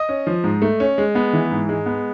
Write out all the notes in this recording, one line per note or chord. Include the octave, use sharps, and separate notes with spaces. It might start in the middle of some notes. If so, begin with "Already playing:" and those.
Already playing: D#5 D#6
C#4
F3
G#2
A3
C#4
G#3
B3
E3
G#2
G#3
B3